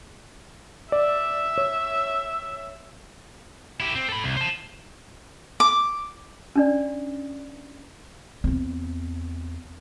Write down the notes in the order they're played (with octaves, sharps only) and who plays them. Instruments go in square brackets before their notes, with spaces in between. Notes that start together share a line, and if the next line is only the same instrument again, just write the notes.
[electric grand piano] D5 [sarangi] E5
[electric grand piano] C#5
[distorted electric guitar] E4 G4
C4
A4 B5
C2
C5 A5
[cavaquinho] D6
[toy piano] C#4 D4 D5
[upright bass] E2 C4